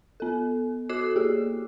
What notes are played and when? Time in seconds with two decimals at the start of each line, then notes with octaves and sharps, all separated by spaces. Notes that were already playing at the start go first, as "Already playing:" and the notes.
0.20 B3 A4
0.89 F#4 A4 D6 F#6 C7 E7
1.16 A#3 G4 G#4